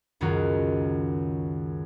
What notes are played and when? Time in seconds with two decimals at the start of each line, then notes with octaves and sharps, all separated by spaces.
0.21 C#2 F#2 D#3 F#3 F4 F#4